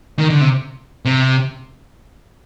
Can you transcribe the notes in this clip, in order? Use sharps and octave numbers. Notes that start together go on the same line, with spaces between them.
D#3
D3
C3
C3